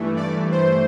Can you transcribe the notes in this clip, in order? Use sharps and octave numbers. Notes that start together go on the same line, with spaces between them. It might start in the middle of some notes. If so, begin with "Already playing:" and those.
Already playing: G2 E3 A3
D5
C5